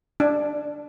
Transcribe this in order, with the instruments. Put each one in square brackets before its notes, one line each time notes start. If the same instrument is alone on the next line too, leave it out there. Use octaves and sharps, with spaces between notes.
[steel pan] D4